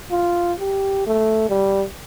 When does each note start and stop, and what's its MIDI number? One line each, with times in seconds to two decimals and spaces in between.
0.11 0.53 65
0.59 1.05 67
1.07 1.48 57
1.49 1.84 55